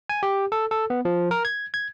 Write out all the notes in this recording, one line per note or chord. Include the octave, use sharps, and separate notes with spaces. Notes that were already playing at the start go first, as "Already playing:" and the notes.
G#5
G4
A4
A4
B3
F3
A#4
G#6
G#6